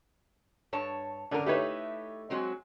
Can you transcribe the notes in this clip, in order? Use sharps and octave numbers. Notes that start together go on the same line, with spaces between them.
G2 C#5 A5
D3 C#4 D4 A#4
A3 D#4 E4 G4 B4 C#5
F#3 G#3 C4